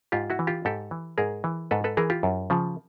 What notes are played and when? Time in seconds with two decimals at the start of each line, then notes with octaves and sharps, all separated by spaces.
0.12 G#2 F4 G4
0.30 E4 F#4
0.39 E3
0.47 F4 G4
0.65 G#2 G4 A4
0.91 E3
1.18 G#2 G#4 A#4
1.44 E3
1.71 G#2 A4 B4
1.84 A4 B4
1.97 E3 G#4 A#4
2.10 F4 G4
2.23 F#2
2.50 C#3 F3